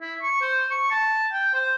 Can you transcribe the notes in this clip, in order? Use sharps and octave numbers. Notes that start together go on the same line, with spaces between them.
E4
C#6
C5
C#6
A5
G5
C5